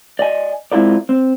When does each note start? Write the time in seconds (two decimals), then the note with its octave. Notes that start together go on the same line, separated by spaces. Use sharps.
0.19 D5 D#5 G#5
0.72 G#3 C4 E4 F4 A#4 D5
1.09 C4